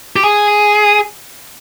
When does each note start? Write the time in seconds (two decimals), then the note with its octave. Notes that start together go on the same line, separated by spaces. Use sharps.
0.16 G4
0.24 G#4